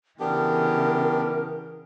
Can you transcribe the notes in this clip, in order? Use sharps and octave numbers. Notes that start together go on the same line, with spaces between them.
C#3 E3 B3 D4 G4 A#4